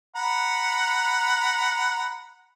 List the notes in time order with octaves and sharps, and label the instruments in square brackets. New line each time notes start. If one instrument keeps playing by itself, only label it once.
[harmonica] F#5 A#5 B5